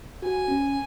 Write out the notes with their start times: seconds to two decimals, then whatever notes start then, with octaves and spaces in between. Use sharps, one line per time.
0.22 F#4 G#5
0.48 C#4